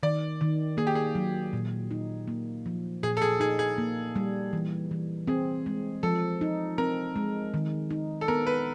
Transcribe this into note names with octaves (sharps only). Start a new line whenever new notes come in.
D#3 D5
D#3
A#3 G#4
G4
G#4
F#3
A#2
D#4
A#3
F3
A#2 G#4
A4
G#4
D#4 G#4
G#4
A#3
G3
E3
E3
C4 G#4
G#3
F3 A4
D#4
C4 A#4
G#3
D#3
D#4
A4
B3 A#4
B4